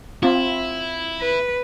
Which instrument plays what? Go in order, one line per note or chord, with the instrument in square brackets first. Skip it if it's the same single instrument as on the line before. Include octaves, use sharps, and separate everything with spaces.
[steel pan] C4 F4 [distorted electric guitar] E4
[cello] B4